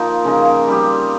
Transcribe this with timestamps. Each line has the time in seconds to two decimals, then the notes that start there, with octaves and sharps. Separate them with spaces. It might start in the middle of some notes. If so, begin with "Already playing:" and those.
Already playing: F3 A#3 D#4 F4
0.25 C#3 F3 A#3 D#4
0.67 G3 C4 G4